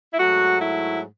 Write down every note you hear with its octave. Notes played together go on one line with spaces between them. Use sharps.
E4
G#2 F#3 A3 F#4
E4